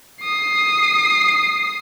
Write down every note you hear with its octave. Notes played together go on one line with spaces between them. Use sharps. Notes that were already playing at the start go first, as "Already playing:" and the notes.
D#6 C7